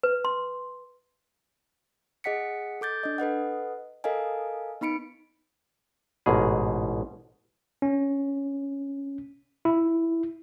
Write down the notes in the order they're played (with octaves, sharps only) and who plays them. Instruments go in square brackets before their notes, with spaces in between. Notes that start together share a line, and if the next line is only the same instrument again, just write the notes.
[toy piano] B4
C6
[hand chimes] G#4 D#5 F#5 B6 C#7
A4 D6 G6 A6
D4 D#5
A4 B4 D#5 F#5
A4 A#4 D#5 F5 G#5
B3 D#4 B5 C#7 D7
[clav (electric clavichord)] A1 G#2 B2 G#4
[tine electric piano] C#4
E4